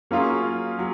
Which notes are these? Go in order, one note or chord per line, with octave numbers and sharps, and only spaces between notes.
F#3 A#3 C#4 F4 G#4
F#3